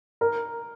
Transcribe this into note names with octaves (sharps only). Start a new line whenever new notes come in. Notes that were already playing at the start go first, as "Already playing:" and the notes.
A#4